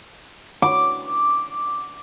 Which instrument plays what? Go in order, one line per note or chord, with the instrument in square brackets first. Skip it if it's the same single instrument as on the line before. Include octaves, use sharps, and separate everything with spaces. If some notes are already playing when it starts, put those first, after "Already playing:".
[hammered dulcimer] D6